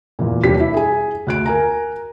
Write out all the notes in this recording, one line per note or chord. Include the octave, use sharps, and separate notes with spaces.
E2 A#2
D#1 B2 D4 G4 B6
E4
G#4 G#5
D2 F#6 D7
A#4 G#5 A#5